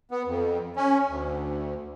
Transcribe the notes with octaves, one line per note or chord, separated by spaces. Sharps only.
B3
F2
C#4
D2